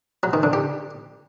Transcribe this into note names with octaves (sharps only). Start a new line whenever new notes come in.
F#3
D#3
D3
G4